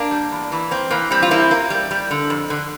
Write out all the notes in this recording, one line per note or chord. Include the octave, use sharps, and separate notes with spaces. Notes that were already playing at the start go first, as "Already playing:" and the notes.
Already playing: A#3 D4
G3
E2
E3
A#3 C4
E3 A#3
G3 C4
F4
A#3 C4 E4
A#3
G3
G3
D3
F2
D3